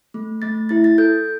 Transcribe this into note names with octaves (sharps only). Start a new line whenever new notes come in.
A3
A3 A6
E4 A6
A6
A4 G6